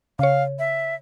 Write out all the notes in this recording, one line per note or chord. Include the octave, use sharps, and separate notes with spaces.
C#3 C#5 F5
E5